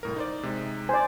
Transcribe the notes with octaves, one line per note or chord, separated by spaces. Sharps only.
C2 A2 A#4
D#4 C5 D5
C3 G#3 D#4
C5 D5 G#5